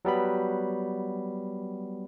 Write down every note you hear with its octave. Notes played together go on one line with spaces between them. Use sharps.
F#3 G3 B3 B5